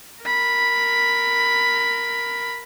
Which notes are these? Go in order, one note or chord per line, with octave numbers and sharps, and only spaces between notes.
A#4 B5